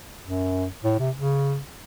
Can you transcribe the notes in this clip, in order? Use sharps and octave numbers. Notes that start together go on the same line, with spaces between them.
F#2
A2
C3
C#3